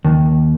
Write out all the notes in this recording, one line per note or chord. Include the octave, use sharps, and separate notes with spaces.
D#2